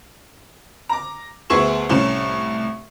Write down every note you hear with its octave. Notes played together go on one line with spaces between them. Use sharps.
A#5 D6
D2 B3 G#4 E5 C#6 E7
C2 A2 C#4 E7